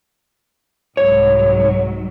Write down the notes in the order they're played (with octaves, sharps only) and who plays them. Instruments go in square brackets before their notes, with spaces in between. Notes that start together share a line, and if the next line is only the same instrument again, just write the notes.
[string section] C2 G#2 F#3 [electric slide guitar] C#5